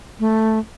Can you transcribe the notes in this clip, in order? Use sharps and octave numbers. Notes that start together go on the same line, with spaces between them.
A3